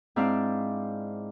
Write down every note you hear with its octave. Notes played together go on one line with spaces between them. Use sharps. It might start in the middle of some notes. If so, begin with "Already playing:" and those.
G#2 C4 D4 E4 F5